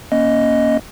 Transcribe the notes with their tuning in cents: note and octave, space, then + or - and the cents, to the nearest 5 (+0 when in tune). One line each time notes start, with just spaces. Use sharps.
A#3 +15 C#4 +0 D#5 +5